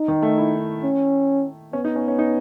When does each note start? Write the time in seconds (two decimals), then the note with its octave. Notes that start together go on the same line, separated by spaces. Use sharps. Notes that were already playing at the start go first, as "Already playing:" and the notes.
Already playing: D#4
0.08 D#3
0.22 A3
0.38 E4
0.83 C#4
1.73 B3 C#4
1.85 D#4
1.96 C#4
2.08 C#4
2.19 D#4